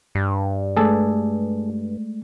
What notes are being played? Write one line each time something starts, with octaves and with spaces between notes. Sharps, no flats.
G2
G#3 A3 G#4 A4 D5